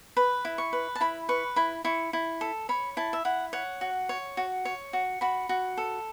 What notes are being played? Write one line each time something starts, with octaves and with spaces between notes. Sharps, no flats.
B4 B5
E4
C#6
B4
A5
E4 B5
B4 C#6
E4 B5
E4 C#6
E4
A4
C#5 B5
E4 A5
E5
E4 F#5
C#5 F#5
F#4
C#5
F#4
C#5
F#4
F#4 B5
F#4
A4